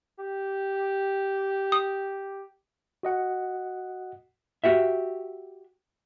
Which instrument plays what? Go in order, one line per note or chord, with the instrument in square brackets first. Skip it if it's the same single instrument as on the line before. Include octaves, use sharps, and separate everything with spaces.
[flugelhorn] G4
[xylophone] D#6
[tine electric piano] F#4 D#5 F#5
[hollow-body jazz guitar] F#4 G4 E5